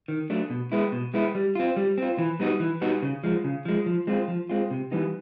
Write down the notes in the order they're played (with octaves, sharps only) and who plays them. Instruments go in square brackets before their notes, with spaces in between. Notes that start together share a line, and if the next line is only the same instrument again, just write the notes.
[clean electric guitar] D#3
F#3 A3 D4
B2
G#3 B3 E4
B2
G#3 B3 E4
G3
C4 F4
G3
C4 F4
E3
G3 B3 D#4 F#4
E3
G3 B3 D#4 F#4
C#3
F3 G#3
C#3
F3 G#3
F3
G#3 C4 F4
F3
G#3 C4 F4
C3
E3 G3 B3 D#4